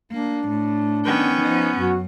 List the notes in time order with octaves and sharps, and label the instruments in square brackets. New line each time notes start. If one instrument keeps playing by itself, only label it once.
[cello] A#3 [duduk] D4
[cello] A2
[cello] D#3 G5 [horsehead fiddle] B3 C#4
[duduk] F3 [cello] D#4
[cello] F#2 [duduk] F#4